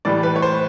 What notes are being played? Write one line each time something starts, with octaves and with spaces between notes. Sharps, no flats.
A2 E3 G3 D5
B4
C#5
C5